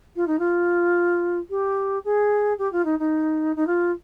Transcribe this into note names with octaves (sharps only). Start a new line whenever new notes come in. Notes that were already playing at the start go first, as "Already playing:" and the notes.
F4
D#4
F4
G4
G#4
G4
F4
D#4
D#4
D#4
F4